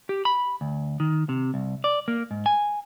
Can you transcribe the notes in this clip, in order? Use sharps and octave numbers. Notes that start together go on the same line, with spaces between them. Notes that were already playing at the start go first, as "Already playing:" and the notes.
G4
B5
D2
D#3
C3
C2
D5
A#3
G#2
G#5